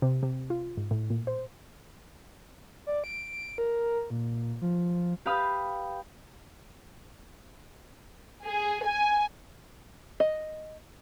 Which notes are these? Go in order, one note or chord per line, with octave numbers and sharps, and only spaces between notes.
C3
C3
F4
G#2
A2
A#2
C5
D5
D7
A#4
A#2
F3
G4 B4 F5 B5 D#6
G#4
G#5
D#5